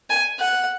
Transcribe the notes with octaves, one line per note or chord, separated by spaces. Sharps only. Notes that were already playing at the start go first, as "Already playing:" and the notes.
G#5
F#5